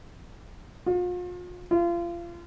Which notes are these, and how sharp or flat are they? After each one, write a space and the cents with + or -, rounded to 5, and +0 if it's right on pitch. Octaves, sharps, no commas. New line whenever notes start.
F4 +40
F4 -30